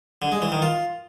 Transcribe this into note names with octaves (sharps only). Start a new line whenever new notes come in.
D3
G#3
E3
D#3
F4